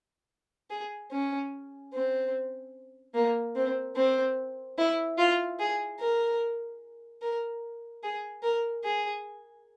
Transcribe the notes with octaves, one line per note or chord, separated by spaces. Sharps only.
G#4
C#4
C4
A#3
C4
C4
E4
F4
G#4
A#4
A#4
G#4
A#4
G#4